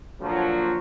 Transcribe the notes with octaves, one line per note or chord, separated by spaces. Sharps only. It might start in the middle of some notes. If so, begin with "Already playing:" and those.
A#2 D3 F3 F#3